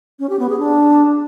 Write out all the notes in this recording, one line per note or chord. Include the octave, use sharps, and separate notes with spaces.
C#4
G4
B3
G#4
D4